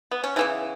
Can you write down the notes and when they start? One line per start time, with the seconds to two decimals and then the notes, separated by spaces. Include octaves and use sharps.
0.11 B3
0.24 C#4
0.36 C#3 E3 B3 E4